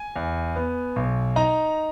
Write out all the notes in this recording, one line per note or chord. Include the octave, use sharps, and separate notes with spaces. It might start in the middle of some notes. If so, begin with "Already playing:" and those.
Already playing: G#5
E2
B3
B1
D#4 A#5